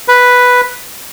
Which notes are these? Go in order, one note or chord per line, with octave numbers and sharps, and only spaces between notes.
B4